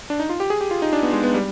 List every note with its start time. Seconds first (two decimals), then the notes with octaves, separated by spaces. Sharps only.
0.10 D4
0.20 D#4
0.29 F4
0.40 G4
0.50 G#4
0.61 G4
0.71 F4
0.82 D#4
0.93 D4
1.03 B3
1.13 G#3
1.23 B3
1.34 G3